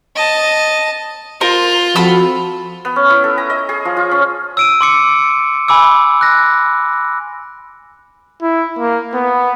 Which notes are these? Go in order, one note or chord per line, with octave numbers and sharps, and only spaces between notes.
D#5 A5
F4 A#4 C5
F3 C4 F#4 A4 B5 E6
B3
C#4
E4
A4
A#5
D#5
G#4
F3
F4
C#4
E6 D7 D#7
C6 D6 C#7
G#5 B5 D6 E6
F#6 A#6
E4
A#3
B3